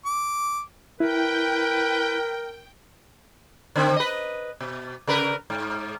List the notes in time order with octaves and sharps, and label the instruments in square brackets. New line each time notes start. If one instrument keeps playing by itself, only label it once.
[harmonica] D6
[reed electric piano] E4 [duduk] A#4 [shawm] B4 [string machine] G5
[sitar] D3 C4
B4 D#5
B2
C#3 A#4 B4
G#2